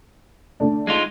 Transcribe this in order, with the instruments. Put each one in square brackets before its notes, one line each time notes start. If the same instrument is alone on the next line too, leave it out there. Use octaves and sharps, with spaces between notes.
[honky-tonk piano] D3 A3 D4
[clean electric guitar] G#3 D#4 F4